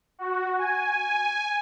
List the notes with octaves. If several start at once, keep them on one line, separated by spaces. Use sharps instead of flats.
F#4
G#5